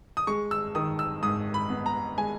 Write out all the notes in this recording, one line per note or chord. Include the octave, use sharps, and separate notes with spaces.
D#6
G#3 C#6
E6
D#3 D#6
E6
G#2 D#6
B5
B3
A#5
G#3 G#5